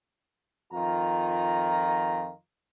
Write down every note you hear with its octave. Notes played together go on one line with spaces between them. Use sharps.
F2 D#3 F4 A#5